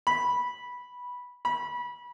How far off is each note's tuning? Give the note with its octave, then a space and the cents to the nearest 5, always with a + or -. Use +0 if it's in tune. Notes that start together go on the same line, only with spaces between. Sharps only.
B5 -10
B5 -25